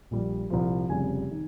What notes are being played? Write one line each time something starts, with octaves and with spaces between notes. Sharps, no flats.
A#1 A#2 G3
C2 A#2 F3
F1 F2 C#3 G3 G#5
D#3